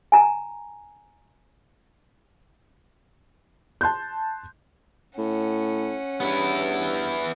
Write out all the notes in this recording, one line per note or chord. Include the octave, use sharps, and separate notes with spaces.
G#5 A#5
A5 C6 F#6 G6
A2 C#4 F#5
G2 B3 E4